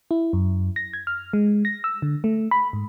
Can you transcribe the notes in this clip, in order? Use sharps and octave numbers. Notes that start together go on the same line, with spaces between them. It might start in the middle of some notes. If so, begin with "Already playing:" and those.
E4
F#2
A#6
G#6
F6
G#3
A#6
E6
D3
A3
B5
G#2